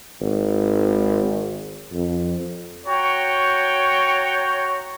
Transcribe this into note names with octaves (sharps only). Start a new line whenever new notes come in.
G#1
F2
F#4 C#5 G5 A#5 C#6